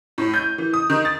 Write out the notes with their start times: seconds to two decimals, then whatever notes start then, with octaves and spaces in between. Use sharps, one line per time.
0.18 A2
0.34 G6
0.58 E3
0.73 D#6
0.90 D#3
1.05 A6